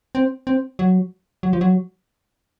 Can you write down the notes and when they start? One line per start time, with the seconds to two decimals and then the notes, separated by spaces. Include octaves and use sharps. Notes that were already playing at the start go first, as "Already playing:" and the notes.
0.15 C4
0.47 C4
0.79 F#3
1.43 F#3
1.53 F3
1.61 F#3